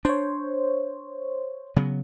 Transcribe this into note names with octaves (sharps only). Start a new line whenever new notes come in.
D4 C5 C#5
C#3 F#3 B3